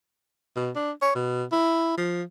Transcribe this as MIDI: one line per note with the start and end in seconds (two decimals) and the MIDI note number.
0.56 0.70 47
0.75 0.91 62
1.02 1.12 73
1.15 1.44 47
1.52 1.93 64
1.98 2.23 53